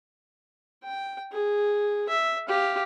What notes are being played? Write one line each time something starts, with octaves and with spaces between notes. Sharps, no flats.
G5
G#4
E5
G4 F5